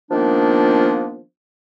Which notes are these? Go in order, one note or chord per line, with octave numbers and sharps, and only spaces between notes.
D#3 F3 A#3 B3 D4